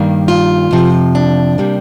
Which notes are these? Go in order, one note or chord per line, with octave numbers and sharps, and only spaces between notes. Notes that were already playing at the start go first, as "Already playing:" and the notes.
Already playing: G2 D#3 G3 A#3
F4
F2 C3 F3
D4
C3 G3 A#3